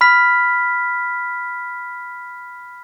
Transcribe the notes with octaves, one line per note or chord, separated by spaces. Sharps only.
B5 F6 B6